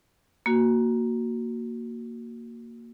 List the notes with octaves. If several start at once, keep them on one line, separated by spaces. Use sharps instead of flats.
A#3 F#4